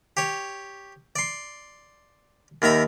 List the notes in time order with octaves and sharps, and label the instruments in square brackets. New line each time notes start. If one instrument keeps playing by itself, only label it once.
[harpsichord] G4 C#5
D5 C6
D#2 D#3 E5 A#5 B5